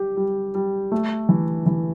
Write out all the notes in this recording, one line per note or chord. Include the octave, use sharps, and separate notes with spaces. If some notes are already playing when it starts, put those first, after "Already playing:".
Already playing: G3 G4
G3
G3
A3
E3
E3